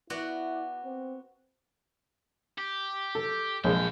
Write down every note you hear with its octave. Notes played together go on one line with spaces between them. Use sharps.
B3 E4 F#4 D5
C4
G4
A4
A#1 F2 G#3 G5